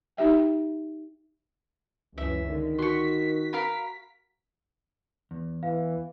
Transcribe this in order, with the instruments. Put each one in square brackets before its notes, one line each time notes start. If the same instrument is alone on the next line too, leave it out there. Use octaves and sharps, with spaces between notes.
[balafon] D#4 G4 E5 G5
[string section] C#2 F#2 C#4 [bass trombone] E3 [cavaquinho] E5
[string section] D3 [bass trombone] D#3
[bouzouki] F#4 [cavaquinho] C6 C#6 [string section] B6
[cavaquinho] A#4 F5 B5
[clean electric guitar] E2
[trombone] E3 [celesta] F5